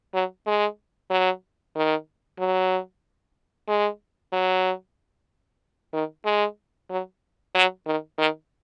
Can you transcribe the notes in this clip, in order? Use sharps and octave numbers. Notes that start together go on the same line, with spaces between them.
F#3
G#3
F#3
D#3
F#3
G#3
F#3
D#3
G#3
F#3
F#3
D#3
D#3